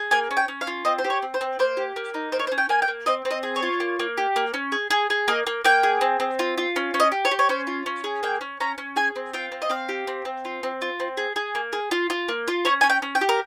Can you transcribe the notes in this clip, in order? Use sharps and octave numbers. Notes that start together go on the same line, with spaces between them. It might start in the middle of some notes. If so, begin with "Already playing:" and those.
Already playing: G#4
A#3 G#5
C#4
G5
C#4
F5
F4
C4 D#5
C5
G4
C#5
C4
C5
C4
A#3 C5
G4
A#3
D#4
A#3 C5
C#5
C5
C#4
G5
A#3 G#5
G5
A#3
C4 D#5
C4
D#5
G#4
C#5
F4
A#3
A#3
G4
A#3
C#4
G#4
G#4
G#4
A#3 D#5
A#3
A#3 G5
G#4
C4
C4
F4
F4
C#4
C#4
D#5
G4
C#5
G4
C#5
C#4 C5
F4
C#4
G#4
A#3 G5
C#4
C#4 A#5
C#4
G#4 G#5
C4
F4 G5
C4
D#5
C4 F5
G4
C4
C4
F4
C4
F4
C4
G#4
G#4
A#3
G#4
F4
F4
A#3
F4
C#4 C#5
C#4 G#5
G5
C#4
G5
G4
A#4